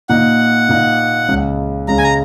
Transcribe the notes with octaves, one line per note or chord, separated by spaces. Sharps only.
A#2 A#3 D#4 F#5
A#2 A#3 D#4
C#2 C#3 G#3
C#2 C#3 G#3 A#5
G#5
A#5